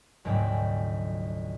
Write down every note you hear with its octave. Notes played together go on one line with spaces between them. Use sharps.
F1 D2 G#2 F#3 D5 G5